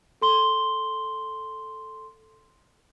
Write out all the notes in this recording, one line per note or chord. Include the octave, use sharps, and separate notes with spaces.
A4 C6 G7